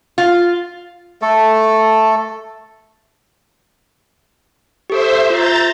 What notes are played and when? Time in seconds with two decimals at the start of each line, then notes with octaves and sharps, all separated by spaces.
0.18 F4
1.22 A3 A4
4.90 G4 A4 C5 E5
5.30 F4 A#5 G6 A6